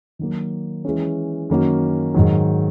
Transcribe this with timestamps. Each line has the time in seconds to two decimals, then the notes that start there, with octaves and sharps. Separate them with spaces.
0.19 D#3 F#3 A#3
0.85 E3 G#3 C#4
1.50 F#2 D#3 A#3 C#4 F#4
2.14 G#2 D#3 F#3